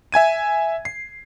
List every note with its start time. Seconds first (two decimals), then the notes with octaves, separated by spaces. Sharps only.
0.12 E5 G#5 G#6 D#7
0.85 C7